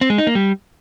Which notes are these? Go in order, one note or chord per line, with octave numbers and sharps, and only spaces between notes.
C4
G#3
D#4
A#3
G3